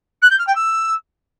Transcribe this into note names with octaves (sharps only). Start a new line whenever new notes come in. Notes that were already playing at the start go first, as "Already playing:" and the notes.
F#6
G6
F6
G5
E6